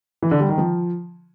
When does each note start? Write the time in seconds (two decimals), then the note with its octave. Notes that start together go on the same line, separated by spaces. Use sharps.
0.22 E3
0.31 D3
0.40 G3
0.49 D#3
0.58 F3